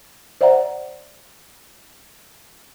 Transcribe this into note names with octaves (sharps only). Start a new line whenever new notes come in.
C5 D5 E5 F#5 A#5